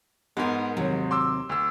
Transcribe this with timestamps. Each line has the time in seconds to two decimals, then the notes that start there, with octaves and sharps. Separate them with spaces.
0.37 G#2 G#3 B3 A#4
0.77 D#2 C3 F#3
1.11 C6 D6 E6
1.49 D2 E6